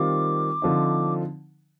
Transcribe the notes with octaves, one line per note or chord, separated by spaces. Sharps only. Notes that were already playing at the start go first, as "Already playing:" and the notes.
Already playing: D#3 G3 C4 F4 D6
D3 F3 C4 D#4